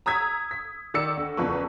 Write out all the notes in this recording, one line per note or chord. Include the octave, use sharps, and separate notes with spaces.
A#5 D#6 E6 G#6 B6
B6
D#3 D5 E6 C#7
D2
F#1 E2 F3 B4 C#6